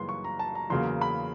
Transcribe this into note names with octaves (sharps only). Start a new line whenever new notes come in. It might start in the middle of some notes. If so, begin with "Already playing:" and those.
Already playing: F#2 C#3 E3 G3 A#3 C6
C#6
A#5
A5
A#5
E2 C#3 F#3 A#3 C6
B5